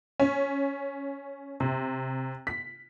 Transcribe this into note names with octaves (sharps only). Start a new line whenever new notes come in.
C#4
C3
B6